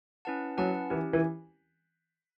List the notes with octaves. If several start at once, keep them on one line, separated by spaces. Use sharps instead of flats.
C#4 E4 B4 F#5 A5
F#3 C#4 E4 B4 F#5 A5
E3 C#4 E4 G4
E3